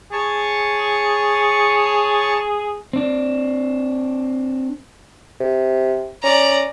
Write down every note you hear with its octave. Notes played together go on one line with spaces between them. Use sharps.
G#4 C#5 A5 C#6
C4 D4
C3
C#4 D5 A#5